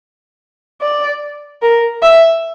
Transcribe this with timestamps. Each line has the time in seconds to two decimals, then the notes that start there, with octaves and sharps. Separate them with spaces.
0.81 D5
1.62 A#4
2.02 E5